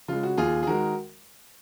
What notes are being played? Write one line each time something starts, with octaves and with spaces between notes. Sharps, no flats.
C#3 G#3 F4
F#4
D#2 F4 G#4
G#4
D#3 G#3 F#4 A#4